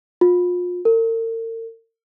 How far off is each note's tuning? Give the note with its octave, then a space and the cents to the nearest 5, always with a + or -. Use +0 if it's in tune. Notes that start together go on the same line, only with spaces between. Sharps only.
F4 +35
A#4 -45